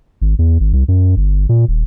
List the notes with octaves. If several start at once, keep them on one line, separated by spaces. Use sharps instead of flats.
G#1
E2
G#1
C2
F#2
G1
A#2
D#1